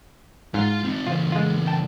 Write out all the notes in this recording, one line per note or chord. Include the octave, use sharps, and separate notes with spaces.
G#2 F4 F5
C4 D#4
C#3 E3 F4 C5
G#3 F4
G5 A5